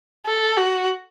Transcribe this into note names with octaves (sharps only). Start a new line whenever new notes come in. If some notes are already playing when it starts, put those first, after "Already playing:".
A4
F#4